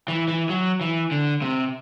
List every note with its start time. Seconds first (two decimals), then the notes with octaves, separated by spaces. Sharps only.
0.08 E3
0.28 E3
0.49 F#3
0.81 E3
1.11 D3
1.42 C3